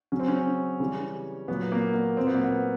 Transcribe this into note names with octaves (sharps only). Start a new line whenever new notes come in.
C#3 F#3 C#4
C4
C#4
C#3 E3 G3
A#2 F#3 B3
A#3
A#3
A#2 F#3 C4
B3
A#3
B3